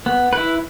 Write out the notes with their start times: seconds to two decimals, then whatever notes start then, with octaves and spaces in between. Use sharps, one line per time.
0.06 B3
0.33 E4 B4